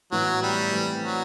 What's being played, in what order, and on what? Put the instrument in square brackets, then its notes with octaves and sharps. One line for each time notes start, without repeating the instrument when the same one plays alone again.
[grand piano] A2 E3 B3 E4 [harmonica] F#3
[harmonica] G3
[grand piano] E3 A3 C4
[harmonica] F#3